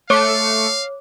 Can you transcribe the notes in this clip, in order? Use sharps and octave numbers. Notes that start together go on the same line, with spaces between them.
A3 C#5 F5 D6 C#7